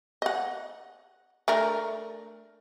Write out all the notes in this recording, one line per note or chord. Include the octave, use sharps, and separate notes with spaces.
D#5 F#5
A3 D4 A#4